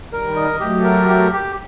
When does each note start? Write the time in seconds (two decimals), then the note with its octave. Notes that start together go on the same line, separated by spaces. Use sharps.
0.12 D#3 G3 A#4
0.36 D#5
0.60 F#3 A3 G4
0.84 A#4
1.08 G4
1.33 G4